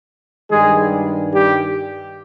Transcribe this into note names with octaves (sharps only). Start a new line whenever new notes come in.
G2 D#3 G3 G#3 G#4
G3 G4